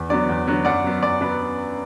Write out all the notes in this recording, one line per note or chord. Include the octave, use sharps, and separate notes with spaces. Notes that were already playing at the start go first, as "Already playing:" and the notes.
Already playing: E2
D3 F#3 B3 D5
E2
D3 F#3 B3
F#2 D5 F#5
F#3 B3
F#2 D5
F#3 B3 B4